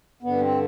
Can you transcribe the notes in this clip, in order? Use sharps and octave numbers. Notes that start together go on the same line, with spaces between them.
G2 D3 B3
C4